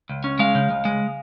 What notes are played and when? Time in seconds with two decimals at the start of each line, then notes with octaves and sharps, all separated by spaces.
0.09 C#2
0.24 C#4
0.39 G#3 F5
0.55 C#3
0.70 C#2
0.85 G#3